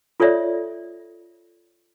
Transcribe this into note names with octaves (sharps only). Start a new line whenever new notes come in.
F4 A4 C#5 D5 E5